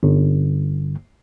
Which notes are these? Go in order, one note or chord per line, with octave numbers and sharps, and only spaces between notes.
G1